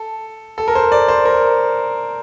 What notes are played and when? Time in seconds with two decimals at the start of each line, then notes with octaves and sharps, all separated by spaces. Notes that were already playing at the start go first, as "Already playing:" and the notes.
Already playing: A4
0.58 A4
0.68 A#4
0.75 C5
0.92 D5
1.08 C5
1.25 A#4